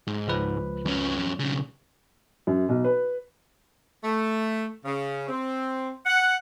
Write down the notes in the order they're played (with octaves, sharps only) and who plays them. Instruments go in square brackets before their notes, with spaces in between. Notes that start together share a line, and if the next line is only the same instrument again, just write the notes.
[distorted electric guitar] G#2
[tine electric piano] C#2 F3 B4
[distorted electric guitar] F2 C#4
B1 C#3
[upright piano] F#2
B1
B4
[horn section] A3
C#3
C4
F#5